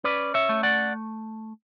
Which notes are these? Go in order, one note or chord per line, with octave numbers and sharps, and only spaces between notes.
C#4 B4 D5
C#5 E5
A3
D5 F#5